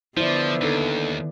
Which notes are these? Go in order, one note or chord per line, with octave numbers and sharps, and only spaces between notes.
D3 F3 B3 E4 C5 D5
D#2 D4 D#4 A4